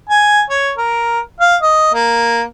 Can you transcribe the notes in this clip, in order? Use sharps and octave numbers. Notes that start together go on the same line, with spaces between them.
G#5
C#5
A#4
F5
D#5
A#3